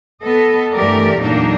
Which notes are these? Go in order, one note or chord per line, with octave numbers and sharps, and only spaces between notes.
B3 A4 D#5
G2 E3 A3 G4 A#4 D5
E2 A#2 F#3 A#3 D4 D#4